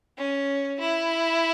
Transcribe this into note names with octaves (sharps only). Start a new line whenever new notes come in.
C#4
E4